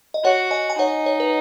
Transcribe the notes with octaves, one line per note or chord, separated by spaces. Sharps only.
D#5
F#4 C#5 F#5
D#5 G#5
G#5
D#4 C#5 F#5
C#5
B4